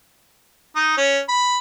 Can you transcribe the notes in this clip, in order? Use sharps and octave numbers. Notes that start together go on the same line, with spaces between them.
D#4
C#4
B5